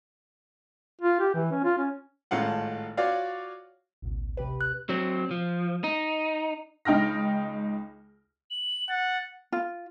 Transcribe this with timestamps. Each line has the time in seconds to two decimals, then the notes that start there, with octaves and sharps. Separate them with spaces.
1.01 F4
1.20 G4
1.34 E3
1.51 C#4
1.64 F4
1.78 C#4
2.31 G#1 A2 F4 F#5
2.97 F4 F#4 C#5 D5 F5
4.02 A1 D2 B2
4.37 C3 G4 B4
4.61 F#6
4.89 F#3 C4
5.31 F3
5.84 D#4
6.85 C#2 D#4 G5 F6 A#6
8.51 F#7
8.89 F#5 A6
9.52 F4